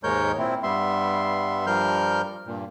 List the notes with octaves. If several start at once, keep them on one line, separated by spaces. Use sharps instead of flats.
D#2 G#2 G#3 A#4 C#5 G6
A#2 C4 E4
G2 G3 B3 E5 C6
G2 F3 G3 A#4 F6 G6
G2 A#2